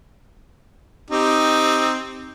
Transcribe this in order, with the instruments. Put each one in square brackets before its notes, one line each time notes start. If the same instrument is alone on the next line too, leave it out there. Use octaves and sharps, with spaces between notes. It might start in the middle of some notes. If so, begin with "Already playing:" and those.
[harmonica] C4 D#4 G4